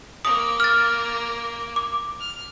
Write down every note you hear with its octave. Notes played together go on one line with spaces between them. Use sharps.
A#3 D#6
F6 A6
D6
F6